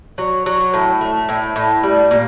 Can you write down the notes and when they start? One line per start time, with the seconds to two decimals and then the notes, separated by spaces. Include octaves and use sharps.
0.18 F#3
0.46 F#3
0.74 A2
1.01 A3
1.29 A2
1.56 A2
1.83 G3
2.11 A#2